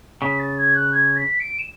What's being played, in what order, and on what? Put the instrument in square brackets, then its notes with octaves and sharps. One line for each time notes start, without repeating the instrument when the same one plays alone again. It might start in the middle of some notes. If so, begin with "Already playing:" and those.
[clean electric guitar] C#3 [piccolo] B6
[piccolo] A6
G#6
F#6
G#6
B6
D7
E7